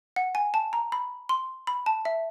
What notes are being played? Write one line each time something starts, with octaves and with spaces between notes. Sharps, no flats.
F#5
G#5
A5
A#5
B5
C6
B5
A5
E5